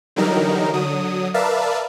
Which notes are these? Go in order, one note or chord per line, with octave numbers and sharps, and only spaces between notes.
D3 E3 F#3 G3 D#4 A#4
D3 F#3 D#6
A#4 B4 D5 E5 F5 A5